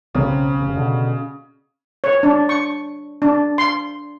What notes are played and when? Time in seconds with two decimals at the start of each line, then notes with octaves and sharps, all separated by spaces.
0.15 B1 C#3 F#3 C4
0.61 F1
0.76 B2 D3
2.04 C#5
2.23 D4
2.49 C#6
3.22 D4
3.58 C6